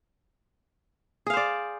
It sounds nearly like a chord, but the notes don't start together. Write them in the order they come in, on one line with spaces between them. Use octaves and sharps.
G#4 F5 C5 D5